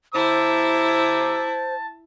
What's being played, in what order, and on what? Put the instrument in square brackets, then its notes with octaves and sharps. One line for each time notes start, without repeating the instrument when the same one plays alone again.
[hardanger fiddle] E4 [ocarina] C5 [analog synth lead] A5 [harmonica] A#5 D6 E6